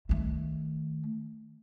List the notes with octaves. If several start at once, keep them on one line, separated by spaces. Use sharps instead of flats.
D#3 A3